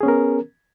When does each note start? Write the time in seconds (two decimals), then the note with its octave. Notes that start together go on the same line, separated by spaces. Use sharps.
0.01 G#4
0.03 C#4
0.06 B3
0.08 A#4